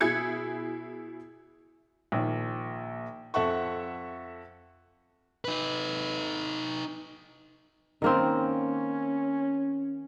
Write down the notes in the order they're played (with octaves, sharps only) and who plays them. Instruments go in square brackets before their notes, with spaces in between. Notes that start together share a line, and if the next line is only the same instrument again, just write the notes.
[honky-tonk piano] B2 E4 G#4 G#6 C#7
[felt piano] A#1 D#3
F2 A4 E5 F#5 C#6
[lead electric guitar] D#4 B4
[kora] D#3 A#3 C4 [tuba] C#4